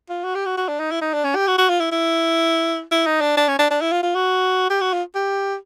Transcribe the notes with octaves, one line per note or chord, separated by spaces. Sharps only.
F4
F#4
G4
F#4
F#4
D4
D#4
E4
D#4
D4
C#4
G4
F#4
F#4
F4
E4
E4
E4
D#4
D4
D4
C#4
D4
D4
E4
F4
F4
F#4
G4
F#4
F4
G4